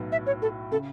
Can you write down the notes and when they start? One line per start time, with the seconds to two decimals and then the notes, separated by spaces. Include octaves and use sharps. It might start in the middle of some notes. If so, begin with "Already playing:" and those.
Already playing: B1 A2 F#3 B3 F#4
0.12 E5
0.26 C#5
0.42 A4
0.71 C#3 A4